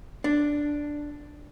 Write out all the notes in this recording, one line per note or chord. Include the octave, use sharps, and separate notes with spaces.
D4